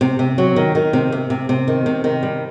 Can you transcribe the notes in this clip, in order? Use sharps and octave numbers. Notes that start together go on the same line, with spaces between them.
C3
C3
F#3
D#3
D#3
C3
C3
C3
C3
D#3
C3
D#3
G3